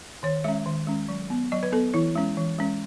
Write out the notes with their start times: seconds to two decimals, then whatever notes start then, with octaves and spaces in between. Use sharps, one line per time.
0.23 D#3 C#5
0.44 G#3 C#4 E5
0.66 D#3
0.87 G#3 C#4
1.09 F#3
1.30 B3
1.52 F#3 D#5
1.63 B4
1.72 B3 A4
1.94 E3 E4
2.15 G#3 C#4
2.37 E3
2.58 G#3 C#4